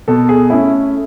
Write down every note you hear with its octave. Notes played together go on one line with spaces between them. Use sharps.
B2 A4
G#4
A3 C#4 E4